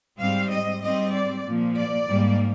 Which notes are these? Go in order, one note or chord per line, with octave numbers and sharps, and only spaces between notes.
G#2 G3 C4 F5
D#5
G#2 G3 C4 D#5
D5
A#2 F3 A#3
D5
G#2 G3 A#3